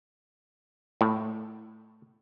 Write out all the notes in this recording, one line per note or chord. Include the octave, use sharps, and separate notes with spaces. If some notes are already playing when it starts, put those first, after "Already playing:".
A2